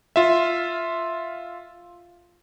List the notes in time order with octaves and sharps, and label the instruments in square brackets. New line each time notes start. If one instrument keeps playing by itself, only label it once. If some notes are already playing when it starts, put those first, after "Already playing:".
[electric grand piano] F4 E5